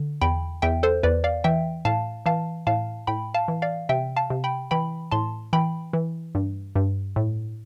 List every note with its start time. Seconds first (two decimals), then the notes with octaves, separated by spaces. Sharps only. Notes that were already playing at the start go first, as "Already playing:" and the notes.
Already playing: D3
0.21 E2 G5 B5
0.62 E2 E5 G5
0.83 A4 C5
1.03 E2 B4 D5
1.24 D5 F5
1.44 E3 E5 G5
1.85 A2 F5 A5
2.26 E3 F5 A5
2.67 A2 F5 A5
3.07 A2 G5 B5
3.34 F5 A5
3.48 E3
3.62 D5 F5
3.89 C3 E5 G5
4.16 F5 A5
4.30 C3
4.44 G5 B5
4.71 E3 G5 B5
5.12 A2 A5 C6
5.53 E3 G5 B5
5.93 E3
6.35 G2
6.76 G2
7.16 A2